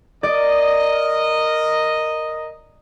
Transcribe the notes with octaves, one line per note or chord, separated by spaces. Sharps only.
A#4 D5 D#5